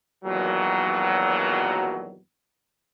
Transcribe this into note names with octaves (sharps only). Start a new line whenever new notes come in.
E2 G2 A#2 D#3 F#3